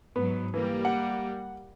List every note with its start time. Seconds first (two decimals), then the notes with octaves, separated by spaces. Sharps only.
0.16 G#2 F#3 B3
0.54 E3 G3 A#3
0.85 F#5